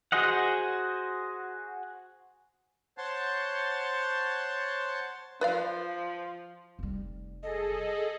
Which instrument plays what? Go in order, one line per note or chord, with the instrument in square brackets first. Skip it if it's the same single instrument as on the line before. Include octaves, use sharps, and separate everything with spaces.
[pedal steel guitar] F#4 G#4 C5 D#5 F#5
[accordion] C5 C#5 F#5 A5 C6
[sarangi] F3 [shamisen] B4 D5 F5
[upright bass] F1 G3
[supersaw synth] G#4 A4 [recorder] D#5